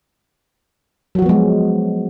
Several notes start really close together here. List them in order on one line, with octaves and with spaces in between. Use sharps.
F#3 F#4 F3 B3 G#3